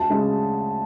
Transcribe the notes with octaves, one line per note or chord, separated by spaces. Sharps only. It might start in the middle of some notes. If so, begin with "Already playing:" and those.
Already playing: D2 A5
C#3 G#3